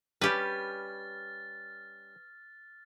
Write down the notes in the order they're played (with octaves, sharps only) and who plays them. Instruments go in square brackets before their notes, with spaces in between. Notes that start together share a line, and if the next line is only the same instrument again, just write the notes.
[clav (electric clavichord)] G3 C#4 [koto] G4 B4 [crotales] F6 A6